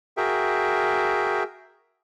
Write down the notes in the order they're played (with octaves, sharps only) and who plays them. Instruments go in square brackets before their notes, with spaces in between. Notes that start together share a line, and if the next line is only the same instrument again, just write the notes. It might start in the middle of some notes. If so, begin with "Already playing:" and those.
[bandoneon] F#4 G#4 A#4 E5 G5